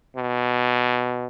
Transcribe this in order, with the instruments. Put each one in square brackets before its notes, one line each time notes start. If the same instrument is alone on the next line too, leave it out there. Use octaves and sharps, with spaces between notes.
[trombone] B2